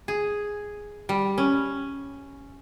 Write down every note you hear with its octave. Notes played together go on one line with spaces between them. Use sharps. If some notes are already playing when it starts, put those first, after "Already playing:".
G#4
G3
C#4